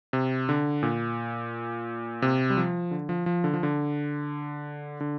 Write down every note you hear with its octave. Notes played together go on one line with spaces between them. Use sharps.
C3
D3
A#2
C3
G3
F3
D3
F3
F3
D3
F3
D3
D3